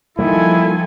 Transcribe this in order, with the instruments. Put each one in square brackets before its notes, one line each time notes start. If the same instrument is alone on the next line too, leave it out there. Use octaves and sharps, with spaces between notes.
[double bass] D#3 F3 [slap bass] G3 A#3 [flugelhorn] E4 [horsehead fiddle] A4 G#5